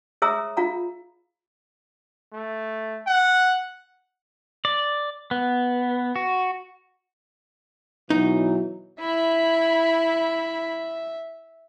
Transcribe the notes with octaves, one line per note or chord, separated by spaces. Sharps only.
G#4 C#5 E5 A#5 D#6 E6
F4 F5 A#5
A3
F#5
D5
B3
F#4
B2 E3 F#3 D#4
E4 E5 B5